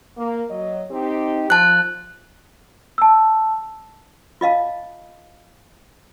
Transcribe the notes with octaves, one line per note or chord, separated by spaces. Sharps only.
A#3
F#3 D#5
C4 D#4 G4
F3 A5 F#6
A5 E6
F4 D#5 F5 A5